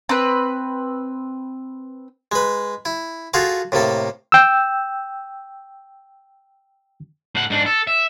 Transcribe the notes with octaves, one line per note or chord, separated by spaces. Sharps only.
C4 B4
G#3 B4
E4
F4 F#4 G#4 A4 F5
A2 C3 A#3 A4
G5 E6
A2 F#5
G#2 D4
A4
E5